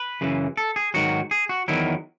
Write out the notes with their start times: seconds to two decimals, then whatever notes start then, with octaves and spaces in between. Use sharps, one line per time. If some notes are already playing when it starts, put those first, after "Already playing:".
Already playing: B4
0.21 F#2 C#3 E3
0.57 A4
0.76 G#4
0.94 G#2 D#3 F#3 F#4
1.31 G#4
1.49 F#4
1.68 E2 D#3 F#3 E4